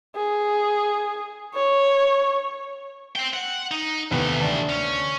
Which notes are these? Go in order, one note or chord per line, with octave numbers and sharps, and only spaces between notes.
G#4
C#5
C5 G5
F#5
D#4
D#2 C3 E3 A3 B3
D2 D4 A5
C#4